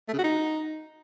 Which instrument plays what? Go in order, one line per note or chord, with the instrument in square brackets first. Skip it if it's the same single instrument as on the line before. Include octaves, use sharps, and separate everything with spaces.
[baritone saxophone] A3
C#3
F#4
D#4